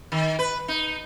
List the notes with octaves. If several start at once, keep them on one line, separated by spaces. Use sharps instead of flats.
D#3
B4
D#4